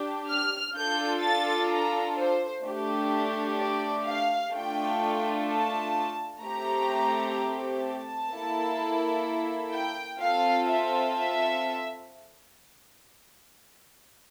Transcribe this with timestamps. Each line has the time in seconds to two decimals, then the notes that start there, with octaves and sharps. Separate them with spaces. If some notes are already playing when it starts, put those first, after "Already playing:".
Already playing: D4 G4
0.29 F6
0.76 D4 F4 A4 G6
1.23 A6
1.70 A#5
2.17 C5
2.64 A3 D4 G4
3.59 D5
4.06 F5
4.53 A3 D4 F4 A4 G5
5.47 A5
6.42 A3 C4 G4 A#5
7.83 A5
8.30 A#3 E4 A4
9.72 G5
10.20 C4 F4 A4 F5
10.67 E5
11.14 E5